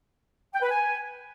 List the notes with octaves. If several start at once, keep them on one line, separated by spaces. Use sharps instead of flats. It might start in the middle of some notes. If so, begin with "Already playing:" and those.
G5
B4
G#5